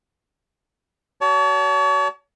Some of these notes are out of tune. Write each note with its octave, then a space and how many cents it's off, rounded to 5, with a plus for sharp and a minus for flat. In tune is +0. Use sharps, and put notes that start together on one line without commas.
F#4 +35 C#5 +40 A5 +0